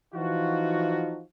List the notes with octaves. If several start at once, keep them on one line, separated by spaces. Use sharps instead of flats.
E3 F3 D#4 F4 F#4